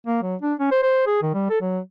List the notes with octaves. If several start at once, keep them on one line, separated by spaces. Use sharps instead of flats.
A#3
F#3
D4
C#4
C5
C5
G#4
D#3
G3
A4
F#3